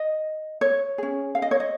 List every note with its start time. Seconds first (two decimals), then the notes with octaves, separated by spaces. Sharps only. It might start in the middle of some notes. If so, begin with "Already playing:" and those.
Already playing: D#5
0.61 C#5
0.98 C#4 G#4
1.35 F5
1.42 D#5
1.51 C#5
1.60 D#5